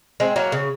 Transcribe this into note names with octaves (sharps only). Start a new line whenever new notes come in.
G#3 C4
F#3 A#3
C#3